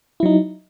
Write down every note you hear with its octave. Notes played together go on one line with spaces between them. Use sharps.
F#3 D#4 E4